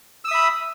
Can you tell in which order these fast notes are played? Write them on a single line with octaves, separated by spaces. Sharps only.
E6 D#6 E5 B5